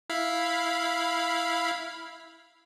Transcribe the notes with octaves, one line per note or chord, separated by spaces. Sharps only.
E4 F5 B5